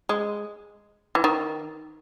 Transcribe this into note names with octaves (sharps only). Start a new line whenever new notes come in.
G#3
E3
D#3